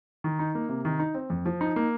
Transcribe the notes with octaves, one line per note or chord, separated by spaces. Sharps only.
D#3
D#4
A#3
C3
D#3
D#4
C4
F2
F3
D#4
A#3